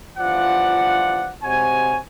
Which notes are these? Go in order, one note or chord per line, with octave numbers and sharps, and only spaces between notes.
G1 E3 F3 F4 D5 F#5
C3 G#3 F#4 C5 C#5 G#5